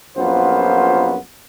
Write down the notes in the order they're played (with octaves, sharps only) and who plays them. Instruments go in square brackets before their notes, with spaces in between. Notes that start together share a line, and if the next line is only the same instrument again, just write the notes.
[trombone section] A#1 F#2 B3 F4 C5